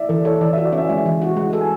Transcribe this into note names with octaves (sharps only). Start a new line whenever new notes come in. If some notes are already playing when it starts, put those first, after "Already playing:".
Already playing: D5 E5
E3 A4
A4 C#5
E3 D5
E5
F#4
D5
C#4
E5
G#3 E5
E3
F#4
G#3 F#5
A4
G#5